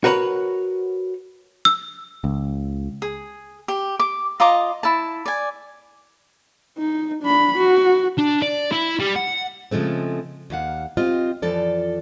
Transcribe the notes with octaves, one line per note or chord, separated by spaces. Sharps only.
F#4 A#4 B4 C#5 F#5
E6
C#2
G#4
G4
D6
F4 D#5 A#5 D6
E4 A5
D5 G#5
D#4
D4 B5
F#4
D4
D5
E4
G3
F#5
C#3 F3 G#3 A3 C4
D#2 A#3 F5 F#5
C4 F4 G4 D#5
F2 E3 F3 A4 D5